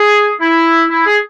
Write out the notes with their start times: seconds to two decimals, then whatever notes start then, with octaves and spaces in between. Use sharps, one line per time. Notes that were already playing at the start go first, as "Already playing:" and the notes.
Already playing: G#4
0.41 E4
0.90 E4
1.06 G#4